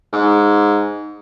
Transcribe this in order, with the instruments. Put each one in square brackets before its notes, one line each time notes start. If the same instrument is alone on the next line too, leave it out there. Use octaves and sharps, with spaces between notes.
[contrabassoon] G#2